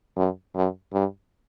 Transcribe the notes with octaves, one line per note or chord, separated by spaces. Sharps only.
F#2
F#2
G2